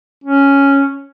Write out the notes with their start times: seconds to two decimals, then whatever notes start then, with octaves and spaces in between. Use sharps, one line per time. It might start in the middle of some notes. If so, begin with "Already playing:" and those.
0.24 C#4